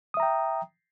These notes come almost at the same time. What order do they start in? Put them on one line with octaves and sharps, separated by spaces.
D#6 E5 A#5 G5